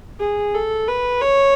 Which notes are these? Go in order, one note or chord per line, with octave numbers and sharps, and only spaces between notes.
G#4
A4
B4
C#5